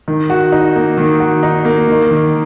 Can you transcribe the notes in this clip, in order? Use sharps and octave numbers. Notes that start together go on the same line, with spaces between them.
D#3
F#4
D#4
A#3
D#3
F#4
D#4
A#3
D#3
D#3